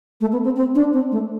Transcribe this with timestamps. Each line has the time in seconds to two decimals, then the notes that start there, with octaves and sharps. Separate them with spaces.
0.21 A3
0.32 B3
0.44 C4
0.56 C4
0.75 D4
0.93 C4
1.12 A3